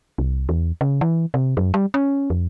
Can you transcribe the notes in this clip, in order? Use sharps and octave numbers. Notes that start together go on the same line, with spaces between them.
C2
E2
C#3
E3
C3
F#2
G3
C#4
F2